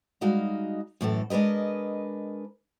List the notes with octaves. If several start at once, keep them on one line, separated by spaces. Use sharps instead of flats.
G3 G#3 D#4 F#4 D#5 F5
F#2 A2 E3 A4
G#3 D4 A#4 B4 D#5